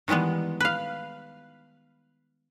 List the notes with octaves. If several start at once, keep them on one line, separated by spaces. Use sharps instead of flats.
D#3 E3 G3 G#3 B3
B4 F5